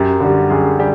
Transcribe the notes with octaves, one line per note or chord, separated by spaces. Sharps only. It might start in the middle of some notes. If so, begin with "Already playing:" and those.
Already playing: F#2 G4
D3 G3
F#2 G#4
G3 G4